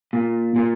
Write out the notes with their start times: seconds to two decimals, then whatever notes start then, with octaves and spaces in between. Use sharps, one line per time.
0.13 A#2
0.56 A#2